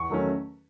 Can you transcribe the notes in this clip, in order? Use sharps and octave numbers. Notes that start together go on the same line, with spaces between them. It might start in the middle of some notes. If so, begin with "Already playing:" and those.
Already playing: E2 C#6
D#3 F#3 A3 C#4